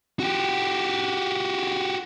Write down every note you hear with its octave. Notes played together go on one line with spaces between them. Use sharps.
F#4 G4